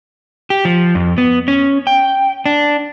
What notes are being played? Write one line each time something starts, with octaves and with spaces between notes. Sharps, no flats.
G4
F3
F2
B3
C#4
G5
D4